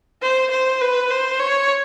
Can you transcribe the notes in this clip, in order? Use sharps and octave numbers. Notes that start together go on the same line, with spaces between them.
C5
C5
B4
C5
C#5